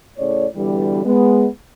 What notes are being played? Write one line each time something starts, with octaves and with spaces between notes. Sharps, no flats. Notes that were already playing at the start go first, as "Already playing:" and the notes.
A2 C#3 C#5 D5
B2 D3 E3 G3
G#3 B3